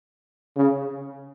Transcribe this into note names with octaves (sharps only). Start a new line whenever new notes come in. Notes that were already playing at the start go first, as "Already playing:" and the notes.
C#3